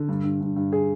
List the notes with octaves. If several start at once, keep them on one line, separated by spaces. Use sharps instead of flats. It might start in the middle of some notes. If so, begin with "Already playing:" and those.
Already playing: D3
G2
G2
G2
G2
G#4